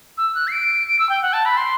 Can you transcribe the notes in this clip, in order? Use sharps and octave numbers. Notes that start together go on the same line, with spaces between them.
E6
F#6
C7
D7
D7
E6
G5
F#5
A5
B5
C6